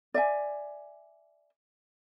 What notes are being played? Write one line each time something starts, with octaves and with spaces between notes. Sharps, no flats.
D5 E5 G#5